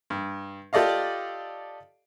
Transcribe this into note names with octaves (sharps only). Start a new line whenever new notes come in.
G2
F4 G4 A4 D5 D#5 F5